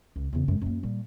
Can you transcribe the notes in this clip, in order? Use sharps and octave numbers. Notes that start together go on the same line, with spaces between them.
C#2
E2 C#3
F#2 G#3
F#2 A#3
A#2 G3